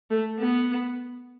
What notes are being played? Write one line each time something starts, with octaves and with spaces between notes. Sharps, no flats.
A3
B3